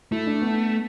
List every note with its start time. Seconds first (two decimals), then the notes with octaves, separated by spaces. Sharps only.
0.12 A3 E4
0.27 D4
0.42 B3